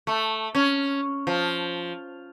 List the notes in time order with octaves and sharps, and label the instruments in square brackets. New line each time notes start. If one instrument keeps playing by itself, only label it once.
[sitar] A3
C#4
F3